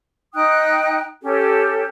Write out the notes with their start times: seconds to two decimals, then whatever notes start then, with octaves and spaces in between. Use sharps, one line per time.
0.34 D#4 G5 D#6 F#6
1.22 C#4 G4 A4